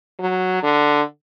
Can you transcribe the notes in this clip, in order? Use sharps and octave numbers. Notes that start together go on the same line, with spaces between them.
F#3
D3